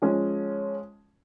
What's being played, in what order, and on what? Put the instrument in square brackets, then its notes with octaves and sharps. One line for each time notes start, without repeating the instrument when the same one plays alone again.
[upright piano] F3 G#3 C#4